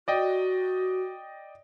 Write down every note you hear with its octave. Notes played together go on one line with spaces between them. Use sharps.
F#4 D5 D#5 G5